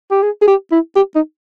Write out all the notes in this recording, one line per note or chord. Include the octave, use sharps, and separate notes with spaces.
G4
G#4
G#4
G4
E4
G4
D#4